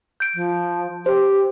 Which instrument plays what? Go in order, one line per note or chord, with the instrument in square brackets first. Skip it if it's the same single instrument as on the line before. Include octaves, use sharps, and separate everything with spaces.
[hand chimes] G6 D7
[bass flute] F3
[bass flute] G4 [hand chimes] C5